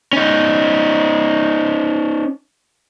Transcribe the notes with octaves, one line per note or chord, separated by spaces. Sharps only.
C#4 D#4